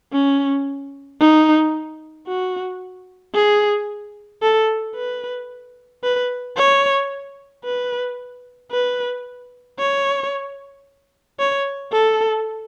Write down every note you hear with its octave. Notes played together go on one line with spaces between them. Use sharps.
C#4
D#4
F#4
G#4
A4
B4
B4
C#5
B4
B4
C#5
C#5
A4